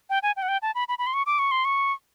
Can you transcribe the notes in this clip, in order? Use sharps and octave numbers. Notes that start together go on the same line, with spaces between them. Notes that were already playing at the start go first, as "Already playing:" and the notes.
G5
G#5
G5
F#5
G5
A5
B5
B5
B5
C6
C#6
D6
C#6
C6
C#6